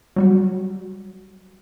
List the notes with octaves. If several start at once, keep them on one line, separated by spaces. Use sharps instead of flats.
F#3 G3 F#4